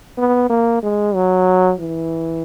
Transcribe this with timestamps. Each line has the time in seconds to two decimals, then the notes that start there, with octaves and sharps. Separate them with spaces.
0.17 B3
0.50 A#3
0.83 G#3
1.15 F#3
1.80 E3